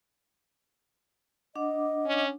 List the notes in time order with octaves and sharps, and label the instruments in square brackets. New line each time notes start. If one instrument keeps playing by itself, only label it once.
[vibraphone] D4 F#5 D6 [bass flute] D#5
[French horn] C#4